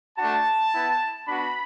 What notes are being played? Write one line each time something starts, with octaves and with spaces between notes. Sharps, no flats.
A3 D4 F#4 A5
B3 E4
B3 D4 F#4 B5